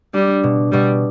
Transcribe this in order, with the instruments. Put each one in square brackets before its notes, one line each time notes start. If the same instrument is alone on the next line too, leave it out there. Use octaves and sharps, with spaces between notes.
[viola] G3 [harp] D4
[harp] B2
[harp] B2 [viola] G3